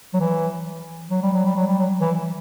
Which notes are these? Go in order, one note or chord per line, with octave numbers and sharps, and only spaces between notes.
F#3
E3
F#3
G3
F#3
G3
F#3
G3
F#3
E3